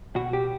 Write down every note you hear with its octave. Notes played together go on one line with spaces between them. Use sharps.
B2 F#4
G4